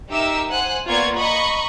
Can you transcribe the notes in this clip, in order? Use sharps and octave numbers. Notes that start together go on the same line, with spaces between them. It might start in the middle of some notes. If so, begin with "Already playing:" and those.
D#4 G4 A#4 E5 E6
C5 F#5 G#5 F#6
A#3 B3 F4 D5 C#6 G#6
D#5 A#5 B5 C#6